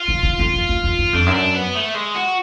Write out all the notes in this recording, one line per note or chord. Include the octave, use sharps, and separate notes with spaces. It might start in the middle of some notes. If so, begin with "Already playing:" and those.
Already playing: F4
C#3
C#3
F2
F#2
F#2
F2
F#2
F2 D4
F#2
D4
B3
A3
G#3
F#4